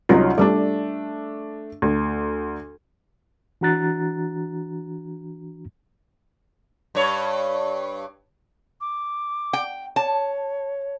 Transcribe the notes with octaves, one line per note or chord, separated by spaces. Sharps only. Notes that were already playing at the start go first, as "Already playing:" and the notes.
C2 F#3 C#4 D#4 F4
G3 A3 D4 D5
D2
E3 D4 F#4 A#5 F#6 A6
G2 C#5
D6
G5
C#5 A5